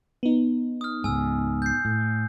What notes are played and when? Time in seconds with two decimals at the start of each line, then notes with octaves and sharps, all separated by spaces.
0.23 B3 D#4
0.81 D#6 F6
1.04 C#2 G#2 G#5 E6
1.62 G6 C7
1.85 A2